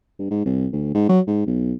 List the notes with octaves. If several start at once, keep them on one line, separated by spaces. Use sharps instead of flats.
G2
G#2
C2
D2
G#2
F#3
G#2
B1